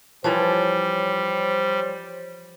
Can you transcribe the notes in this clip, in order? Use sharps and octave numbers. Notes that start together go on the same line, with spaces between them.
E3 F3 G3 C5 C#5